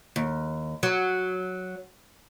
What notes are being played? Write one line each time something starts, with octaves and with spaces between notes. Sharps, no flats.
D#2
F#3